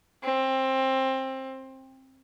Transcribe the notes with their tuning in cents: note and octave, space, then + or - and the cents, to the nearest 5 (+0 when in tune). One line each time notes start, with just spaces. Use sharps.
C4 +20